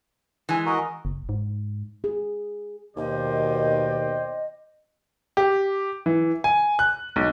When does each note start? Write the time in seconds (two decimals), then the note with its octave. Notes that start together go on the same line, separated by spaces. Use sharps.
0.49 E3 G#3 G#5
0.66 F#4 A#4 D#5
1.05 F#1
1.29 G#2
2.04 G#4
2.97 D#2 B2 D#3 C5 D5 D#5 G5
5.37 G4
6.06 E3
6.44 G#5
6.79 F#6
7.16 B1